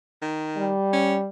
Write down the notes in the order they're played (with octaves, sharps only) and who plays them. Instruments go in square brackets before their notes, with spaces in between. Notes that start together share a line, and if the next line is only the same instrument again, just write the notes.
[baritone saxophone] D#3
[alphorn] G3
[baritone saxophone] C#4